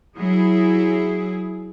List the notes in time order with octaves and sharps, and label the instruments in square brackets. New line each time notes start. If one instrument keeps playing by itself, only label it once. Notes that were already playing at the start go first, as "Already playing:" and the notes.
[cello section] F#3 E4 G#4